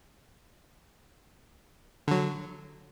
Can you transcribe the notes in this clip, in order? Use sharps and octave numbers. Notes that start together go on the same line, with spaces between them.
D3 F#3